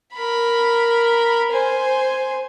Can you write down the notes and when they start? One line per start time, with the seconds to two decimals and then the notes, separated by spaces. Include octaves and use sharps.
0.15 A#4 B5
1.51 C5 G#5